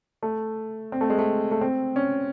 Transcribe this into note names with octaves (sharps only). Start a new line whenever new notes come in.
A3
C4
A3
G#3
A3
A3
C4
C#4